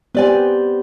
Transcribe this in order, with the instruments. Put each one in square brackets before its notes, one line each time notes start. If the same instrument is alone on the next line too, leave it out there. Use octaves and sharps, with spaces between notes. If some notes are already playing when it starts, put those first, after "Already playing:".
[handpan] B3 G4 C5 [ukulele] B4 D5 G#5